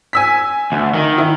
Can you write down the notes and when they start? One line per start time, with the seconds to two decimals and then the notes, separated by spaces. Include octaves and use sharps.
0.13 G#5 E6 B6
0.72 D2
0.94 D#3
1.18 E4